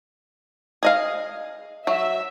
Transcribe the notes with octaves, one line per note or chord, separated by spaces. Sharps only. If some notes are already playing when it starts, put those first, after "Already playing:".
G#4 D#5 F5
F#3 E5